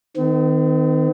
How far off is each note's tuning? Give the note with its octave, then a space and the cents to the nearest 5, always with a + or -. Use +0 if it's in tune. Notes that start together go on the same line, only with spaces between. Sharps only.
D#3 +0 C4 -40